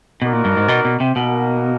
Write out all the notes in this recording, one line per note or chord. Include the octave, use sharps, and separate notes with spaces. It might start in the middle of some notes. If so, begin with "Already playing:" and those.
B2 D#4 F#4 A#4 D5
A#2
G2
G#2
B2
B2
C3
B2 A#3 D#4 F#4 A#4